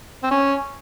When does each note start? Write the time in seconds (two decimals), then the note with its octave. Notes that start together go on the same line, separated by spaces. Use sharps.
0.23 C4
0.31 C#4